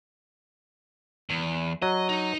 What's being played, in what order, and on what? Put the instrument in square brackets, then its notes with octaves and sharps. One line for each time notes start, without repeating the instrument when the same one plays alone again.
[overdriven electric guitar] E2
[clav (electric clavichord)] F#3 [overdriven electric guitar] D#5
[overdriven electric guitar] D#4